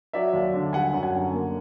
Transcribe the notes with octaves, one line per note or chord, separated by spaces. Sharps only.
F#3 D5 E5
D#2
D3
G3 F#5 G#5
F#2
F#5 G#5
D3
A#3